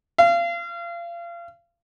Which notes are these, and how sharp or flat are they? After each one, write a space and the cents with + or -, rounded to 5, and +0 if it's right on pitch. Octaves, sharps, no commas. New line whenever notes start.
F5 -30